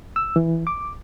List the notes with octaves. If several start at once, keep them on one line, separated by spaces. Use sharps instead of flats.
E6
E3
D6